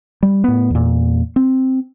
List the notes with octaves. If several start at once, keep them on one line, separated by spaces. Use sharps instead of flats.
G3
A2 B3
E2 A#2
C4